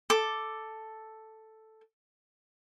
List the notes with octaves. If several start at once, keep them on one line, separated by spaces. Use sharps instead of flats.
A4 D6